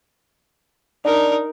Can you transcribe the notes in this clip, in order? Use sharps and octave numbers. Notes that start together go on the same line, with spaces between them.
D4 D#4 A#4